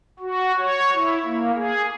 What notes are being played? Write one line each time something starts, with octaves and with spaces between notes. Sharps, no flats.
F#4
C#5
E4
A#3
G#4